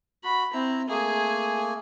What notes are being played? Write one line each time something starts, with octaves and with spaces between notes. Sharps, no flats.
F#4 B5
C4 E4 A#5
A3 A#3 G#4 G#5